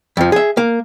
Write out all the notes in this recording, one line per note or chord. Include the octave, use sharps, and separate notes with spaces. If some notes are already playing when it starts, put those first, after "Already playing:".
F2 F3
G#4 E5
A#3